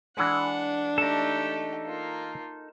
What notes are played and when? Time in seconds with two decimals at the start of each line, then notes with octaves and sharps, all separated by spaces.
0.17 E3 G#3 D4 F#5
0.98 A3 D#4 G4 A4
1.86 A#3 F4